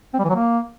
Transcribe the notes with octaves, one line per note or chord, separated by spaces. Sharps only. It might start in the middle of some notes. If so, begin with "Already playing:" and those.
C4
G3
E3
F#3
A#3